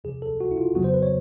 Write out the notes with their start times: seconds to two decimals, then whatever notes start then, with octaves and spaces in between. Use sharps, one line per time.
0.04 E2 C3 F3 G#4
0.22 A4
0.41 F#4
0.51 E4
0.58 F4
0.75 F2 C#3 F#3 B3 F#4
0.84 C5
0.94 B4
1.03 C#5